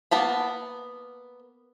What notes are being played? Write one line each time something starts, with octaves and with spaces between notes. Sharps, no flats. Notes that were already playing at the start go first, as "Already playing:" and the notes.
A#3 B3 A5 B5